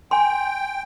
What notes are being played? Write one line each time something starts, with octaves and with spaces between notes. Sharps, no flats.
G5 G#5 C6